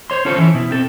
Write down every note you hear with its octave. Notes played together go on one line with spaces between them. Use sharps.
C5 C#5 C6
C#4 F4 A4 C5 C#5
E3 E4
B2 E4
C4 A4